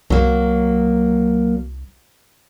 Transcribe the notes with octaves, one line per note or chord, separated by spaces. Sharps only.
C2 F#3 A#3